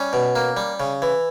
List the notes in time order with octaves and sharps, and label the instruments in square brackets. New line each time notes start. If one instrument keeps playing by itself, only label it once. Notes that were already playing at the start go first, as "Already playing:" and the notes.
Already playing: [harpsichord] G3 C#4
B2
A#3
G3
C#3
E3